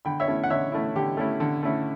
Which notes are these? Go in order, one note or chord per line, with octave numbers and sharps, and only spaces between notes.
D3 G5 B5
C#5 E5
A3 C#4 E4
F#5
D3 C#5 E5
A3 C#4 E4
D3 G4
A3 C#4 E4
D3
A3 C#4 E4